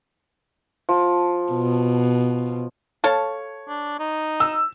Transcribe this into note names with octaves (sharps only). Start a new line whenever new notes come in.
F3
B2
A4 C#5 F5 A5
D4
D#4
E6